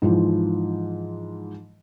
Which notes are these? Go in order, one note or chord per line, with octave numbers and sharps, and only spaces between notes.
G#2 E3 F3